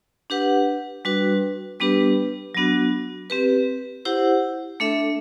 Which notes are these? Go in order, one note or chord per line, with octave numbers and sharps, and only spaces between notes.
D4 G4 B4 F#5
G3 D4 F#4 B4
G3 B3 D4 G4 B4
F#3 B3 D4 F#4
C4 G4 B4
E4 G4 C5 F#5
A3 D4 A4 E5